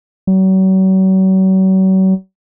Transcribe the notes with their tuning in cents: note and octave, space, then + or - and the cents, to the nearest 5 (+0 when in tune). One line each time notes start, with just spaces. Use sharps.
F#3 +40